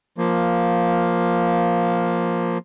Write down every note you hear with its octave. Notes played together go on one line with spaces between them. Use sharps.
F3 A#3